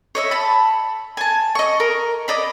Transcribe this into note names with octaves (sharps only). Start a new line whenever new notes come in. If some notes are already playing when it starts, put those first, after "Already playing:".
C#5 D#5 E5
A5 B5
G#5 A5
D#5 C#6
A#4
D5 D#5 B5